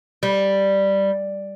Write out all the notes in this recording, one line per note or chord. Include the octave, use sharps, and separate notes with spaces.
G3